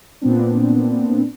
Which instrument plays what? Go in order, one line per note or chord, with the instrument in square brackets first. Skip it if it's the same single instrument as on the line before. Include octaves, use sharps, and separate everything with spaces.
[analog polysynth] A#2 B3 C4 D4